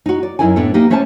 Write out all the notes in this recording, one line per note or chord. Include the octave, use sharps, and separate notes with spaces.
D#4 F#4
D5
F#2 D#4 E4 A#4 G#5
A2 B3 D4 A4
A#3 B3 D#4 G4
A3 C#4 C5 D5 F5 A5